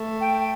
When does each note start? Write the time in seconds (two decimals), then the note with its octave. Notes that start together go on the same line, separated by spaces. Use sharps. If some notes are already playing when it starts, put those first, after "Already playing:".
Already playing: A3
0.21 G5